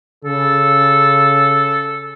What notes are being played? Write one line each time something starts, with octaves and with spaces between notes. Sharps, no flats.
C#3 A4